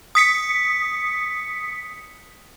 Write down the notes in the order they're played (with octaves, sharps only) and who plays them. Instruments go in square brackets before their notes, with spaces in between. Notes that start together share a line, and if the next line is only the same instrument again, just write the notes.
[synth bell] D#6 B6 C#7